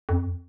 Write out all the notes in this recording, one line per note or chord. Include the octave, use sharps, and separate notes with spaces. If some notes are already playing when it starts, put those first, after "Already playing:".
F2